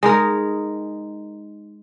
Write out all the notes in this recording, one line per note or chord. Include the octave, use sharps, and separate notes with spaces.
G#3 D#4 A#4